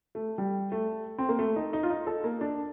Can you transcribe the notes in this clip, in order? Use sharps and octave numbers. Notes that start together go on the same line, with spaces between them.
A3
G3
A3
C4
A#3
A3
D#4
D#4
F4
D#4
A4
A#3
D4